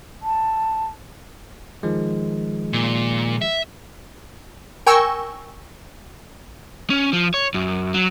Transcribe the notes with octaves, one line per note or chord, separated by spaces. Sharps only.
A5
D#3 F3 G#3
A#2
E5
A#4 G5 G#5 C#6 E6
C#4
F3
C#5
F#2
F#3